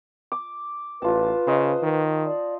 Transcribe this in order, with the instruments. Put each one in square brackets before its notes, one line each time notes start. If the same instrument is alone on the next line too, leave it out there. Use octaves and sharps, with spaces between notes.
[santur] D6
[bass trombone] A1 [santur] F4 A5 [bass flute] B4
[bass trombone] C#3 [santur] C5 D#5
[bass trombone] D#3
[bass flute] D5